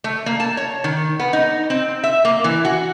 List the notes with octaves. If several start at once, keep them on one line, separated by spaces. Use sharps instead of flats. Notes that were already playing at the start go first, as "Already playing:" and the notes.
A3
A#3
A5
C#5
D#3
B3
D#4
C4
E5
A#3
E3
F#4